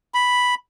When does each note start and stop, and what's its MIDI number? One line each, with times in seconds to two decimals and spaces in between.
0.14 0.55 83